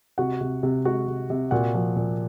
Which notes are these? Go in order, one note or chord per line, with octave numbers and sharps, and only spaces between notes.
C3 F#4 F#5
C3
C3
G#3 F#4 F#5
C3
C3
A#2 F#4 F#5
F3
A#2